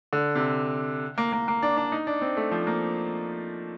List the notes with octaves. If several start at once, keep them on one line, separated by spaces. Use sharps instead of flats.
D3
C3
A#3
A#3
A#3
D4
D4
D#4
D4
C4
A3
F3
A#3